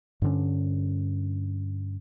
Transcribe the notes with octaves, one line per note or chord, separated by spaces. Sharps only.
G2 D3 C#4